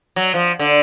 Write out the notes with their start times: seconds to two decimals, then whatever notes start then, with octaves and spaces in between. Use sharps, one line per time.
0.16 F#3
0.34 F3
0.59 D3